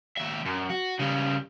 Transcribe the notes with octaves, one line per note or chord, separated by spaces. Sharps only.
D#2 E5
F#2
F#4
C#3 G3